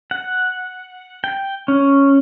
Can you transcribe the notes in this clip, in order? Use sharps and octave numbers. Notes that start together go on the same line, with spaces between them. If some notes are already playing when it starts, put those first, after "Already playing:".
F#5
G5
C#4